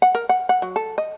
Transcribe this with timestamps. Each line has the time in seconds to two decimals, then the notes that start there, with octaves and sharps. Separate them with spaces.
0.02 F#5
0.15 A#4
0.29 F#5
0.49 F#5
0.62 F#3
0.76 A4
0.98 D#5